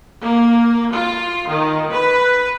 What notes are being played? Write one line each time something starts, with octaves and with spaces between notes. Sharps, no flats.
A#3
F4
D#3
B4